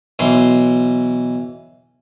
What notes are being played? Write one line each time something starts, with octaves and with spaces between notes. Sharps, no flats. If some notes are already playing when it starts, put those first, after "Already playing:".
B1 E3 C6